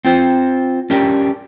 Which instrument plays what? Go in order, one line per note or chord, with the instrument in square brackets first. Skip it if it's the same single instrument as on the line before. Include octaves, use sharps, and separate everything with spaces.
[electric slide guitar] C4 F4 C5
C#4 D4 G4 A#4